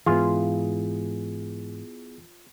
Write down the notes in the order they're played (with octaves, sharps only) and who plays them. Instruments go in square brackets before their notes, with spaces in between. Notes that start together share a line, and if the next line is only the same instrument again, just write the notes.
[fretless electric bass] G#2 E3 [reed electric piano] B3 E4 G#4 [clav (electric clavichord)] F4